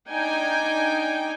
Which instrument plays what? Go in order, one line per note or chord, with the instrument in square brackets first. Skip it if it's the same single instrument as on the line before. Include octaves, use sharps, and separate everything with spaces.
[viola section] D4 D#4 G5 G#5